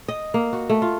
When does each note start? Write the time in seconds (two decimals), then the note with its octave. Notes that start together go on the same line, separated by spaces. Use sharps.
0.08 D#5
0.34 A#3
0.53 F#4
0.70 A3
0.82 F4